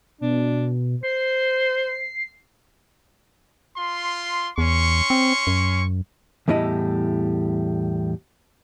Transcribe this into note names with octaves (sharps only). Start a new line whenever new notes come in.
B2 D4
C5 C7
F4 C6
E2 C#4 C6 C#6
C4
F#2
E2 A2 G3 E4 D#5